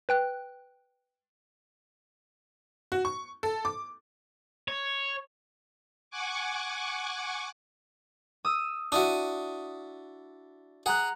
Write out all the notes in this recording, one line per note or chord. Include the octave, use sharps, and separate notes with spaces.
B4 G5 F#6
F#4
C#6
A4
D6
C#5
F#5 G#5 C#6 D6
D#6 E6
D4 E4 F#4 D#6
G#4 F#5 A#5 F#6